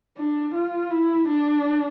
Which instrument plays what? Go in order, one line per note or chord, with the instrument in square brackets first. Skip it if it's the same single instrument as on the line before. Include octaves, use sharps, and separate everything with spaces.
[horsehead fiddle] D4
F4
E4
D4